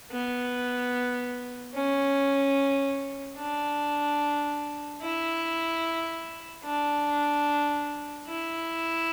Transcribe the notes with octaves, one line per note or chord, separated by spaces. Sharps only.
B3
C#4
D4
E4
D4
E4